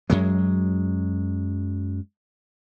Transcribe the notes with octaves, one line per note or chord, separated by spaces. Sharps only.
F#2 F#3 G#3